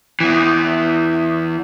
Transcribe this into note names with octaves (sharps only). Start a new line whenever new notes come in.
E2 E3